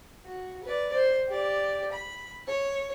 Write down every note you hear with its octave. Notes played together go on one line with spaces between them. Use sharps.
F#4
B4 D5
C5
G4 D5
B5
C#5